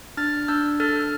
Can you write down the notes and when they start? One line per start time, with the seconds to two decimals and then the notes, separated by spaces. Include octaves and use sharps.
0.17 D4 F6 A6
0.48 D4 E6 G6
0.80 A4 F6 A6